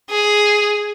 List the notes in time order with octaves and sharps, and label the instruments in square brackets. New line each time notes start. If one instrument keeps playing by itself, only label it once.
[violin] G#4